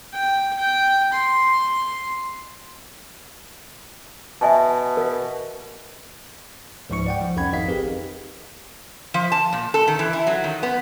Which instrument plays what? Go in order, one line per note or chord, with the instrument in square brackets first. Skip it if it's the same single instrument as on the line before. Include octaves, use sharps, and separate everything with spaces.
[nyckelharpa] G5
G5
C6
[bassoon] B2 [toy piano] E5 G#5 A5
[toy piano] A#4 F5
[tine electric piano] C#2 G#2 F3 D#4 C#6 C#7
D5 F#5 G5
F3
C2 F2 C#4 F#5 B5 G#6
G#1 F2 D#4 D#5 F5 B6
C4 G4 G#4 A#4 B4
[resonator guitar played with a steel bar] F3
A5
A#2
A4
D#3
E3
E4
F#3
D#3
B3